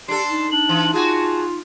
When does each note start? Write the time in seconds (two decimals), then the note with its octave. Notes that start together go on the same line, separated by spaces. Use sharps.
0.08 D4 G4 A4 C6
0.30 D#4
0.52 D4 F#7
0.69 E3
0.93 F4 F#4 G#4 A5